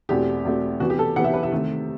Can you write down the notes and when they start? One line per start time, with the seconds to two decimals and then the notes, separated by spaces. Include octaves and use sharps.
0.09 E2 B2 A3 C4 G4
0.45 E2 B2 A3 C4
0.80 C3 E3 B3 F#4
0.90 G4
0.99 A4
1.16 C3 E3 B3 F#5
1.24 E5
1.34 B4
1.43 E5
1.52 C3 D#3 A3 C4